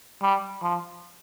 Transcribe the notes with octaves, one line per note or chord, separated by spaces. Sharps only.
G3
F3